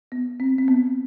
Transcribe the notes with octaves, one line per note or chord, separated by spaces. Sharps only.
B3
C4
C4
B3